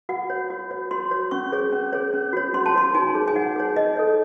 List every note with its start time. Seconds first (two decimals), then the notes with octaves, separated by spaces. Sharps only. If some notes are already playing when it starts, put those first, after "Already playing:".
0.09 F#4 F#5
0.30 C#5
0.50 F#4
0.71 C#5
0.91 F#4 C6
1.11 C#5
1.31 C#4 C#6
1.52 G#4 C#5
1.73 C#4
1.93 G#4 C#5
2.13 C#4
2.33 F#4 C#5
2.54 C#4 C6
2.66 A5
2.75 F#4 C#5 C6
2.94 D#4 G#5
3.15 G#4 C#5
3.28 G#5
3.35 D#4 F#5
3.56 G#4 C#5
3.76 D#4 D#5
3.97 A4 C#5